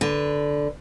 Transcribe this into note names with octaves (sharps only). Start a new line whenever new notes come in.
D3 B4